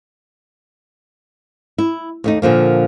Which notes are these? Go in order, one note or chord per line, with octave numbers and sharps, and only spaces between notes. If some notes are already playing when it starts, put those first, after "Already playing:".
E4
D#2 A3 D#4
A#2 D3 F3 A#3